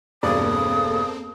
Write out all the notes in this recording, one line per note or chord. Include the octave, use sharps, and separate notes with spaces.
E1 G2 A#3 C4 A4 D5 D#6